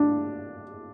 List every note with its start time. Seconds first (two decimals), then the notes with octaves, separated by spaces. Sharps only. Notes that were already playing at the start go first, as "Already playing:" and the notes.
Already playing: D4